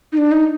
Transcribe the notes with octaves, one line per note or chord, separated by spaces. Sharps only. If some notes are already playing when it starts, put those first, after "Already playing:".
D#4
D4
D#4